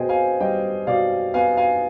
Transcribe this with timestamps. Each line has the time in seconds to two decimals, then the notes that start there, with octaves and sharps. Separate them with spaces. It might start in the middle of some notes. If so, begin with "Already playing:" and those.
Already playing: B2 B3 G#4 C5 D#5 G5
0.09 F5 G#5
0.40 G3 D#5 G5
0.87 B2 D5 F5
1.34 B3 F5 G#5
1.57 F5 G#5